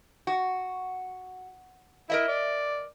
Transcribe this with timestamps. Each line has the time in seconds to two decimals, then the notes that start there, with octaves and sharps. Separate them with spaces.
0.27 F#4
2.10 E4 A#4 D#5 E5
2.28 D5